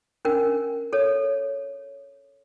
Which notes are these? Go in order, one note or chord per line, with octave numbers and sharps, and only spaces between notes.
C#4 D4 A#4
A4 C#5